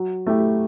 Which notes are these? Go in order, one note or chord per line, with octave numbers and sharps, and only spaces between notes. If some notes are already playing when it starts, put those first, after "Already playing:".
Already playing: F#3
A3 E4 G4